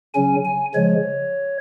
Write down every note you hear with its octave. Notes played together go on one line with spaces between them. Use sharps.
C#3 F#3 C#4 G#5
G#5
C#3 F3 G#3 C#5